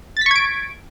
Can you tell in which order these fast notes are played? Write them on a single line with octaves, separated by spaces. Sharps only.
A6 B6 C#6 G#6 D7